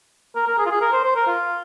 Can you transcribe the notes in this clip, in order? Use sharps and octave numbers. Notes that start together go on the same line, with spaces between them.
A#4
A#4
G#4
F4
G#4
A#4
C5
C5
A#4
F4